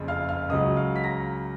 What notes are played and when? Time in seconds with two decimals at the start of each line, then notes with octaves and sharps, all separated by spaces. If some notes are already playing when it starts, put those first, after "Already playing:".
Already playing: F#1 F2 C#3
0.08 F5 F6
0.29 F5 F6
0.49 C#2 C#3 F#3 D#5 D#6
0.77 F5 F6
0.96 B6
1.04 A#5 A#6